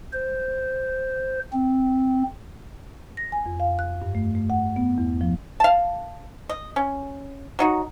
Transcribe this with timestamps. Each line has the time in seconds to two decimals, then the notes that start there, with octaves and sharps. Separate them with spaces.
0.13 C5
1.53 C4
3.17 A#6
3.32 G#5
3.46 F2
3.60 F5
3.79 F#6
4.02 G2
4.15 A3
4.35 A3
4.50 F#5
4.76 B3
4.98 E2
5.21 F3
5.60 F5 A5
6.49 D#5
6.76 C#4
7.59 F#3 D#4 F#4